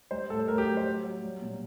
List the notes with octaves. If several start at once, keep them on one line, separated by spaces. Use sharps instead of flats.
G3 C5
A2 A4
A2 A#4
G4
F#3
C5
F#3
F#3
G3
A#2